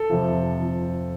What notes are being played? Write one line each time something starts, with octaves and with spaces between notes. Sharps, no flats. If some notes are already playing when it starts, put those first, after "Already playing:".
Already playing: A4
F2 C3 F3
F2 C3 F3